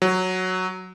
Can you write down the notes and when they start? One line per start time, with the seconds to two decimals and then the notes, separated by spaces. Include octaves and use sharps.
0.02 F#3